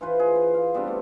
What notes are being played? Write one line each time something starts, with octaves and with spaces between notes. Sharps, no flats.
E3 F4 B4 C5
G#4
C5
F5
G3 B3 C4 D4
A3